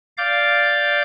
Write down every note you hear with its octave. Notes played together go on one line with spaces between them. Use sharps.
D5 F5 D6 G6